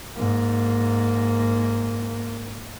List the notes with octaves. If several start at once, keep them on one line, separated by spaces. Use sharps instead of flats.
G#2 A#3